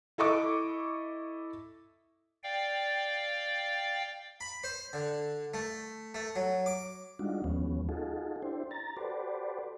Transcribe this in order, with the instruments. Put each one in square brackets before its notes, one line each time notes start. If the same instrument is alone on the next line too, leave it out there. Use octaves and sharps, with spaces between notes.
[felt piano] E4 A4 D#5 C#6 D6
[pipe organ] D5 F5 G5
[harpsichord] B5
C5
D3
A3
A3
F#3
D6
[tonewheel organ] G3 G#3 D4 D#4 F4 F#4
D#2 F3 G#3 B3 C#4
D#4 F4 F#4 G#4 A4
D4 E4 G4 C5
A#5 A6
F#4 G4 A4 B4 C5 D5